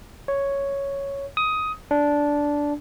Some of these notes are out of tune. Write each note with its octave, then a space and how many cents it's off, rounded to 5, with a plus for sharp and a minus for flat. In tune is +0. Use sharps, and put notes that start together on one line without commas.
C#5 +0
D#6 +15
D4 -10